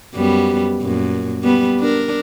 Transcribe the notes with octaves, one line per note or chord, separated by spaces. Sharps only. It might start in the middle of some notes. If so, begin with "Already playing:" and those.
F#2 G3 B3
F#2 A#2
G3 B3
D4 A#4